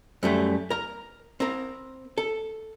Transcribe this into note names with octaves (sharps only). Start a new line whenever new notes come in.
F#2 G3 A3
A#4 A#5
C4 A#4
A4